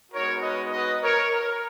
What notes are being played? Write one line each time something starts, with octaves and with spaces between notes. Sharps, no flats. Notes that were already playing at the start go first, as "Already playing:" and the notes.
G#3 B3 D#4 F#4 A#4 C#5
B4 D#5
B4 D#5
A#4 C#5
A#4